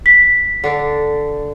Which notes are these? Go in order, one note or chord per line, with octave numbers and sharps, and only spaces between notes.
B6
D3 D4